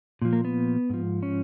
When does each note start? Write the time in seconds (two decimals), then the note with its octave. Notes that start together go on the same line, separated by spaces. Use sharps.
0.22 A#2 F3
0.33 A#3
0.45 B3
0.90 G#2 F3
1.23 C#4